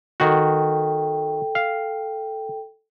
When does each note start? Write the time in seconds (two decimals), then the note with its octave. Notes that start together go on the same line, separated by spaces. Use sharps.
0.20 D#3 F#4 A4 G5
1.55 F5